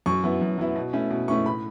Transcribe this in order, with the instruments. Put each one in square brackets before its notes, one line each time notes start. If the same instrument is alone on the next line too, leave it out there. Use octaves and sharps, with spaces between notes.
[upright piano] F#2 C#6
F#3 B3 E4
F#2
F#3 B3 E4
B2
A3 C#4 E4
B2
A3 C#4 E4 C#6
A2 B5